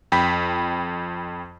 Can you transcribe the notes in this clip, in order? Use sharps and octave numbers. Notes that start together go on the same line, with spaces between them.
F2 G5 B5 B6